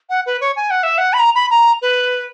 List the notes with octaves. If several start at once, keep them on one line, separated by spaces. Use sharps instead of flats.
F#5
B4
C#5
G#5
F#5
E5
F#5
B5
A#5
B5
A#5
B4